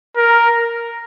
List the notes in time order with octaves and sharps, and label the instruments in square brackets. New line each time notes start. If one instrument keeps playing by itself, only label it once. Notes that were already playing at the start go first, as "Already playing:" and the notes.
[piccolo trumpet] A#4